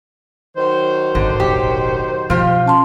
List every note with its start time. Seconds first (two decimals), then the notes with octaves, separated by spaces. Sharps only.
0.56 D#3 F#3 C5
1.15 G#1 D3
1.40 E1 A1 G4
2.30 B2 F3 F4 G4
2.66 C#4 A5 C6